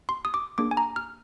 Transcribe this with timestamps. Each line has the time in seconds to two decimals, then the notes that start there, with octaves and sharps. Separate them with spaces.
0.09 C6
0.25 D#6
0.34 D6
0.58 A#3 D4 G#4 D6
0.71 G#5
0.77 A#5
0.96 F6